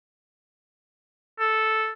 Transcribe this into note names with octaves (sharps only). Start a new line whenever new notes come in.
A4